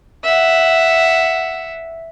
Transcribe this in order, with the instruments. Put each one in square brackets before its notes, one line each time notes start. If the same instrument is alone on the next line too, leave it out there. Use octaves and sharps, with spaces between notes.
[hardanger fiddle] E5 F#5